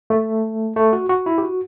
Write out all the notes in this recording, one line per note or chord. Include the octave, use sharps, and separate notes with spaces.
A3
A3
F#4
F#4
E4
G4
F#4